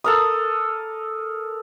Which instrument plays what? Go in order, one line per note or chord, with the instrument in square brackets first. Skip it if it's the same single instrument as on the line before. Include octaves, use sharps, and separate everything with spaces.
[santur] A4 A#4 D#6